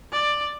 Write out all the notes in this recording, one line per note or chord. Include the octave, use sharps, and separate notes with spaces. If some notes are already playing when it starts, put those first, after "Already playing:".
D5